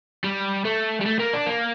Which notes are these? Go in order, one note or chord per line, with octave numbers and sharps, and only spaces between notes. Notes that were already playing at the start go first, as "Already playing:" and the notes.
G3
A3
G3
A3
A#3
D4
A#3